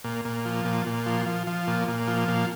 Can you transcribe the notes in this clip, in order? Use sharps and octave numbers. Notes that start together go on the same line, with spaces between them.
A#2
A#2
F3
A#2
A#2
F3
F3
F3
A#2
A#2
F3
A#2